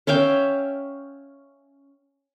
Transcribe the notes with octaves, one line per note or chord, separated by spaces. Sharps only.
C#4 E5 F5 G5